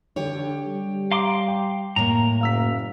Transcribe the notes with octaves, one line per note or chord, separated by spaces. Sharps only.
D3 G4 C#5
G3
F5 A#5 C6 D6
G5
A2 A#3 A#5
F#1 F5 E6 B6